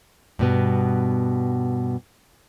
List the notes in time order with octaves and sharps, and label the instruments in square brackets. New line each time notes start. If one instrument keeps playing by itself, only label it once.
[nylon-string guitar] G2 B2 B3